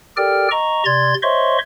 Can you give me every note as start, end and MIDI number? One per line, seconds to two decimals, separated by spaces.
0.17 0.48 67
0.17 0.48 69
0.17 0.48 70
0.17 0.48 74
0.17 0.48 79
0.17 0.48 89
0.51 0.84 75
0.51 0.84 82
0.51 0.84 85
0.85 1.14 48
0.85 1.14 74
0.85 1.14 84
0.85 1.14 92
0.85 1.14 93
1.23 1.58 72
1.23 1.58 73
1.23 1.58 75
1.23 1.58 76
1.23 1.58 84
1.23 1.58 85